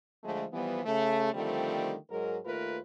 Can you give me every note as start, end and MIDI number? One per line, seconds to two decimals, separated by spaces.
0.24 0.45 50
0.24 0.45 53
0.24 0.45 56
0.24 0.45 57
0.53 0.84 52
0.53 0.84 53
0.53 0.84 55
0.53 0.84 59
0.85 1.30 49
0.85 1.30 57
1.34 1.95 50
1.34 1.95 51
1.34 1.95 53
1.34 1.95 55
1.34 1.95 57
1.34 1.95 60
2.11 2.38 44
2.11 2.38 54
2.11 2.38 56
2.11 2.38 70
2.46 2.78 39
2.46 2.78 57
2.46 2.78 65
2.46 2.78 70
2.46 2.78 71